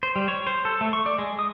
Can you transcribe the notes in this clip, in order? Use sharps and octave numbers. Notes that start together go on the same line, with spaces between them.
C5
G3
C#5
C5
A4
A3
C#6
D5
G#3
D#6